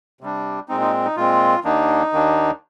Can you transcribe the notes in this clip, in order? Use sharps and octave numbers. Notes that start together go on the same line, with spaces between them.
C3 G3 D4
A#2 G#3 C4 D#4
D#4
D#4
A#2 G#3 C4 F4
D#2 D#3 A#3 D4 D#4
D#2 D#3 A#3 D4